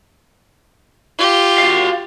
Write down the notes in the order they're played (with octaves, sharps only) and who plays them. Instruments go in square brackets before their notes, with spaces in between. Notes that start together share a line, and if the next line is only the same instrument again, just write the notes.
[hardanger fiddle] F4 G4
[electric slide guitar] F#4 F5